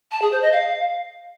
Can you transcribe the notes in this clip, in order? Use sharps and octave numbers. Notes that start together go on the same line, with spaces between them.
A5
G#4
C5
D#5
F5